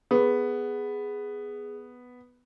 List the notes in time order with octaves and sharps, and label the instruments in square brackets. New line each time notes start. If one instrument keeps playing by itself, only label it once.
[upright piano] B3 [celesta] G#4